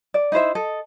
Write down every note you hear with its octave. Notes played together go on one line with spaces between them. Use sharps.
D5
D#4 E4 C5 E5
A4 D#5